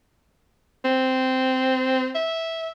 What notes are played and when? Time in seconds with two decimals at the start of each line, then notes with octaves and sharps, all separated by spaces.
0.84 C4
2.15 E5